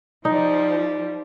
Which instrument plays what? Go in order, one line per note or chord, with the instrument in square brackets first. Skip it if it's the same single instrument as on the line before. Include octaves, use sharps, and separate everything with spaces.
[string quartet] F3 G3 [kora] D#4